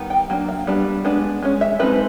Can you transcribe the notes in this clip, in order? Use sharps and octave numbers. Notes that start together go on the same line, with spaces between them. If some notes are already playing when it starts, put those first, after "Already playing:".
Already playing: D#3 G3 B3 D#4
G5
F#3 A#3 D4
F5
G3 B3 D4
G#3 B3 D4
G#3 C#4
E5
F3 G#3 C4 D#4 B4